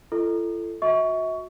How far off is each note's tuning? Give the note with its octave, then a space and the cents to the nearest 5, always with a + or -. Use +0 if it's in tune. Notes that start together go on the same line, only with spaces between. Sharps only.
F4 -45 A4 +0 D#5 +0
F#4 -25 E5 -45 C#6 +20